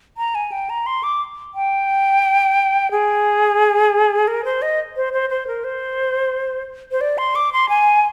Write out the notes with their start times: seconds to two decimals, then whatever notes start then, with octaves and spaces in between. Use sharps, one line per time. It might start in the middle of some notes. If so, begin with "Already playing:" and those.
0.17 A#5
0.35 G#5
0.52 G5
0.70 A#5
0.86 C6
1.03 D6
1.55 G5
2.91 G#4
4.28 A#4
4.45 C5
4.62 D#5
4.96 C5
5.13 C5
5.30 C5
5.47 A#4
5.64 C5
6.92 C5
7.01 D5
7.18 C6
7.35 D6
7.53 C6
7.69 G#5